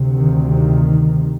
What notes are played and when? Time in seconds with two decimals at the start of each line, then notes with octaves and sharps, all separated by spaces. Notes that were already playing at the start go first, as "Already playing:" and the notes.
Already playing: D2 C3
0.13 D#3
0.47 D#3